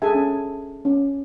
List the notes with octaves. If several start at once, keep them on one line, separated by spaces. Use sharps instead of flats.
G#4 A4 E5 G#5
C#4
C#4